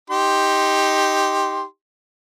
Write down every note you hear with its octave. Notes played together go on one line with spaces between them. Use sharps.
D#4 G4 C6